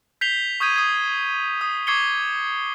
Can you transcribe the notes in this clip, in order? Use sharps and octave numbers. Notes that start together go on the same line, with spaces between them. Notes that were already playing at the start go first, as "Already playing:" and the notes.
G6 B6 C7 F7 G7
C#6 D#6 G6 G#6 D#7
D#6 G#6
D#6
C#6 D6 G#6 C7 C#7 G7